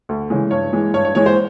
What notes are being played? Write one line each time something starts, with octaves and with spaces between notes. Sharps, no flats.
D2
C#3 E3 G#3
G2 C#5
E3 G#3
G2 C#5
C#5
E3 G#3 C#5
C5